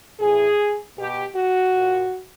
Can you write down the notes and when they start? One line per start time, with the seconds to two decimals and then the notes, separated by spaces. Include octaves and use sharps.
0.19 A2 E3 G#4
0.97 B2 G4
1.36 F#4
1.75 A#2